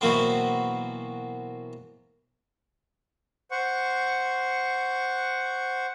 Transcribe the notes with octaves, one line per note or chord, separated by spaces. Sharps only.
B2 E3 F#3 A#3 C4
C5 F#5 C#6